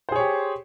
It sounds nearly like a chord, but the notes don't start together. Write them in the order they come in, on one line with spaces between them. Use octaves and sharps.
C5 G#4 C#5 G4